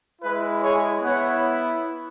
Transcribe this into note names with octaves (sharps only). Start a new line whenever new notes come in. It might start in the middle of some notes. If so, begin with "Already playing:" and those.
G#3 E4 B4
G#4 C#5
B3 E4 C#5 F#5